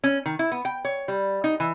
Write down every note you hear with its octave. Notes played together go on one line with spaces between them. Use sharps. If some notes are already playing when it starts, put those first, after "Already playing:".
C#4
D#3
E4
B3
G5
C#5
G3
D#4
E3